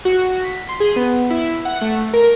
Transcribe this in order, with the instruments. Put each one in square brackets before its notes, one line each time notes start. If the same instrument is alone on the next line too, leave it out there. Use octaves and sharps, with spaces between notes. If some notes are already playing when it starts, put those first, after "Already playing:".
[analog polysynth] F#4
B6
C6
G#4
B3
E4
F#5
A3
A#4